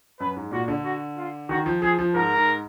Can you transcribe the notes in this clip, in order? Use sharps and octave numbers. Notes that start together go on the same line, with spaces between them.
F#2 B4
G#2
A#2 F#4
D3
F#4
F4
D#3 F#4
F3
F3 G#4
F3
G#2 A#4
G#2